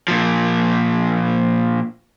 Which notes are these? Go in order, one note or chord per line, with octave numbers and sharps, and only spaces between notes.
A#2 F3